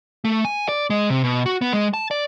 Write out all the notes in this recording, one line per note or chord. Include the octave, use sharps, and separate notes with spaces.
A3
G#5
D5
G#3
C3
B2
F#4
B3
G#3
A5
D5